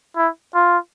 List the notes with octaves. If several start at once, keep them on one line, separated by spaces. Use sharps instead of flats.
E4
F4